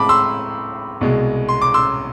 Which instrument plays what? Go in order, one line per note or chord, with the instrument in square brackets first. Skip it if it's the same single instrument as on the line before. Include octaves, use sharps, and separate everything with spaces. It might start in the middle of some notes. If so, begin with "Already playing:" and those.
Already playing: [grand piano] A2 G#3 C4 A5 B5 D6
C6 E6
C2 B2 G#3
C6
D6
C6 E6